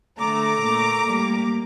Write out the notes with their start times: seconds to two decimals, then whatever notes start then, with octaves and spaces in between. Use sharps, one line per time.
0.19 D3 A3 A#5 D6
0.61 A#2 A3
1.04 A2 G3 A#3